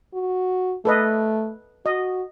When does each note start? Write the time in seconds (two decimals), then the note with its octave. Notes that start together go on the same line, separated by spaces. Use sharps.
0.14 F#4
0.85 A3 A4 B4 D#5
1.86 F#4 D#5